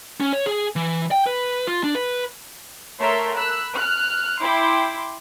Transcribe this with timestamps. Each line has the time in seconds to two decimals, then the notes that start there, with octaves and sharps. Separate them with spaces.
0.20 C#4
0.33 C#5
0.46 G#4
0.76 E3
1.11 G5
1.26 B4
1.67 F4
1.84 D4
1.95 B4
3.00 A3 A#4 C#5 E5 C6
3.36 B5 E6 F#6
3.75 F6 F#6
4.42 E4 G5 C6 D6